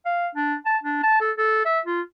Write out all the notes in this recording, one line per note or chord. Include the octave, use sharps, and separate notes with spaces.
F5
D4
A5
D4
A5
A4
A4
E5
F4